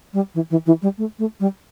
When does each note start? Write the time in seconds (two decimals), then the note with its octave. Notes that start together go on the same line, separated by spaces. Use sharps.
0.13 G3
0.34 E3
0.50 E3
0.66 E3
0.82 G3
0.98 A3
1.19 A3
1.40 G3